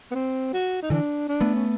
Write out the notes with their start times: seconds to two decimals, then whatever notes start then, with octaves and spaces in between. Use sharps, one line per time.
0.11 B3
0.15 C4
0.53 F#4
0.82 D#4
0.90 D3 E3 D4
1.29 D4
1.41 A3 B3
1.55 C#4